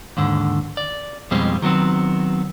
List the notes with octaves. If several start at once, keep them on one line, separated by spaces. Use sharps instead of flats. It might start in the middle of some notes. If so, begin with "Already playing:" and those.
D#2 G#2 D3
D5
F2 B2 G3 G#3 C4
D#3 F#3 B3 C4